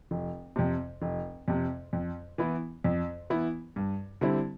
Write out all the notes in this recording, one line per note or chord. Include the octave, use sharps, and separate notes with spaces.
F1
F2 C3
F1
F2 C3
F2
E3 B3 E4
F2
E3 B3 E4
G2
D3 G3 C4 E4